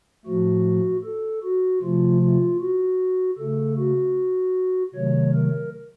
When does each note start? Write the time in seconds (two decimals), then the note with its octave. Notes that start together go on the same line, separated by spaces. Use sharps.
0.25 A2 F3 A3 F#4
1.04 A4
1.43 F#4
1.82 C3 F3 A3 F4
2.22 F4
2.60 F#4
3.38 C#3 A3 A4
3.77 F#4
4.95 C3 D#3 F#3 A3 C#5
5.34 A#4